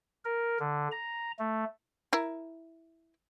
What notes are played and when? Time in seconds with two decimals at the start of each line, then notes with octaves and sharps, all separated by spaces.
0.25 A#4
0.60 D3
0.92 A#5
1.39 A3
2.13 E4 A#4